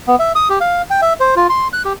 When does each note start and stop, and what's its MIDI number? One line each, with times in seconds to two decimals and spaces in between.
0.08 0.16 59
0.19 0.32 76
0.35 0.48 87
0.49 0.59 67
0.61 0.82 77
0.90 1.01 79
1.02 1.13 76
1.20 1.35 72
1.36 1.47 65
1.49 1.68 84
1.73 1.82 90
1.85 1.93 67